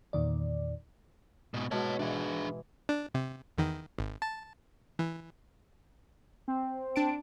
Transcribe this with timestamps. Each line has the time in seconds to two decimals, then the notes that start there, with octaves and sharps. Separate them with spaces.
0.13 E2 A#2 D#3 D5
1.54 G#2 B2
1.71 G#2 B2 C#5 A5
1.99 E3 D4 G#4
2.89 D4
3.14 C3
3.58 E2 D#3
3.99 G#1
4.22 A5
4.99 E3
6.48 C4
6.96 D4 A5 D7